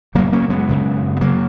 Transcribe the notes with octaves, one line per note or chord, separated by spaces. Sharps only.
F#2 C#3 F#3 A#3
A#3 C#4
G#3 B3
F#2 C#3
B3
C#3 F#3 A#3